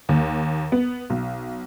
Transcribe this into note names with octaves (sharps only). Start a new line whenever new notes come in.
D#2
B3
B1